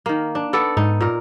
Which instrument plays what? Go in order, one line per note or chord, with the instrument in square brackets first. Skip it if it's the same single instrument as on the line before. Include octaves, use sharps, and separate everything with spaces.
[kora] D#3 A#3
D4
B3 A4 D5
[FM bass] G#2 [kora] D#4
[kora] A#2 A#4